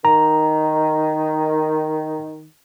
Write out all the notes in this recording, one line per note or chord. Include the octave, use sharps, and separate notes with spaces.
D#3 A#5